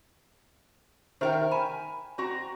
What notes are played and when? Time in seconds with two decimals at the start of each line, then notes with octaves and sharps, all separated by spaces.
1.21 D#3 A#4 C5 E5 G5
1.52 G#5 B5
2.18 C4 F#4 A#5